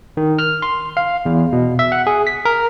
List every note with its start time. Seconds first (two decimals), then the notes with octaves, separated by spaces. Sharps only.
0.17 D#3
0.39 F6
0.62 C6
0.97 F5
1.26 E2
1.52 B2
1.79 E5
1.92 F#5
2.07 G#4
2.27 B6
2.45 A#4